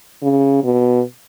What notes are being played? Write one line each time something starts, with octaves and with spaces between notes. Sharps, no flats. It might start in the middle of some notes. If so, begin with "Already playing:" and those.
C#3
B2